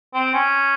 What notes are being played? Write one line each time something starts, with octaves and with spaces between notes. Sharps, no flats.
C4
C#4